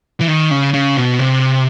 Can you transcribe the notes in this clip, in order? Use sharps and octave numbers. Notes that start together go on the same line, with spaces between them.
E3
D#3
C#3
C#3
B2
C3